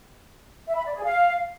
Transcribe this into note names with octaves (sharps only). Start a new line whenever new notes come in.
E5
B5
D5
G#4
F5